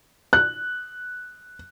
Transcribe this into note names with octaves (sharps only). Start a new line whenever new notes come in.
F#6